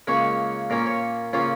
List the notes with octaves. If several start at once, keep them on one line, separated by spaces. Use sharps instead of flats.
C#2 C#3 A#3 C#4 C#5
A#2 A#3 C#4 A#4
C#5
C#3 A#3 C#4 F4